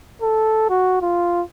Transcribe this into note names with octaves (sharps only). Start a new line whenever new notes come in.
A4
F#4
F4